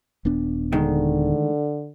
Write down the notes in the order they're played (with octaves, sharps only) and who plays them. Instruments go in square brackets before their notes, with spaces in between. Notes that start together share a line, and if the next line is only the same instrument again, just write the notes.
[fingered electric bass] D#1 B3 D4
[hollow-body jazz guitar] D2 D#3 G#3 [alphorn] D3